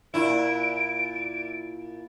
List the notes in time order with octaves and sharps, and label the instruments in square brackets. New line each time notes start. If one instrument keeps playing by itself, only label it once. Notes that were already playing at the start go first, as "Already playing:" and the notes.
[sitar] A#2 E4 [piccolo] D7